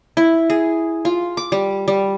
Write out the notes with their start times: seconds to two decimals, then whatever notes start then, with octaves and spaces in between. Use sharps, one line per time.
0.17 E4
0.50 G#4
1.05 F4
1.37 D6
1.52 G3
1.88 G3